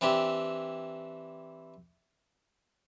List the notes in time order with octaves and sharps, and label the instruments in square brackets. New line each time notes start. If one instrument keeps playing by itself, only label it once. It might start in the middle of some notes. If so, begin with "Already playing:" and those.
[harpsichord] E3 C4 D4 E4 G4